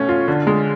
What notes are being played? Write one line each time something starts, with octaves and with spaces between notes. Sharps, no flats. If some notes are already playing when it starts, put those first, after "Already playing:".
Already playing: B2 A3 C#4
F4
D3
G#3